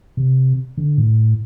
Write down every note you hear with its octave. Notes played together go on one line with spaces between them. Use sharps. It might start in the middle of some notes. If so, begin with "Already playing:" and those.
C3
D3
A2